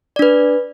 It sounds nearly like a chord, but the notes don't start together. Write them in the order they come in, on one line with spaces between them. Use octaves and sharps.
D5 D4 B4